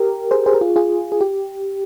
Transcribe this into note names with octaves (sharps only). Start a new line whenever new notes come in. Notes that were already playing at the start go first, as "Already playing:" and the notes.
Already playing: G4 A#4
G#4 C5
G#4 C5
A#4
F4 G#4
F4 G#4
G#4
G4